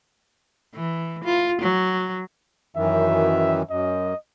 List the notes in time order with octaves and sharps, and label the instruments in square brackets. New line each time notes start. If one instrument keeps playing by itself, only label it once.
[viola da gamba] E3
F4
F#3
[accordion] F#2 D#3 E3 [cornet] E5
[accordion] F#2 [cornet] D#5